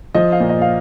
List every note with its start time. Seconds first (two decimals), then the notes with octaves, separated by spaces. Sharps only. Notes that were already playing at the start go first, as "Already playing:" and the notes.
0.15 F3 D#5
0.32 F5
0.40 A#2
0.49 D#5
0.62 F5